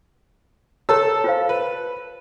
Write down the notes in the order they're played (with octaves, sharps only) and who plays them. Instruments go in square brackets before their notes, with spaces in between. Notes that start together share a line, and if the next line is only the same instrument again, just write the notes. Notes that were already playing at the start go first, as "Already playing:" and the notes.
[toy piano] G4 C#5 A#5 [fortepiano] A4 A5 E6
[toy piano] F4 C5 F5
[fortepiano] B4